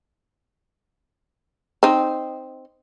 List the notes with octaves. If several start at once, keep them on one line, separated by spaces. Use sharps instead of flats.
C4 D#4